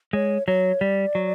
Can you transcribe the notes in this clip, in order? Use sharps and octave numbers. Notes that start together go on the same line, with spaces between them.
G#3 C#5
F#3 C#5
G3 D5
F#3